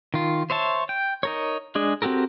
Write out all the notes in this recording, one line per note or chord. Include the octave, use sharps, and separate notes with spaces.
D#3 F4
C5 C#5 E5 A5
G5
D#4 A#4 C#5
G#3 D4 G#4
C4 F#4 G4 A4 A#4